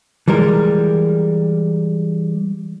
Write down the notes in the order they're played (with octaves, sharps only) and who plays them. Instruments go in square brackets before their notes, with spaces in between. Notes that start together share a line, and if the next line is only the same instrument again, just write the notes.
[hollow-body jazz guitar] E3 G3 G#3 A#4